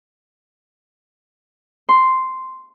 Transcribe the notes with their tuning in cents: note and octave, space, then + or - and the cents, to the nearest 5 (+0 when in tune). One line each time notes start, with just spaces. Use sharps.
C6 -5